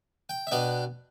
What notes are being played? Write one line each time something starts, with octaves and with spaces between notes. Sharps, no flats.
G5
E5
B2 B3 D4 G5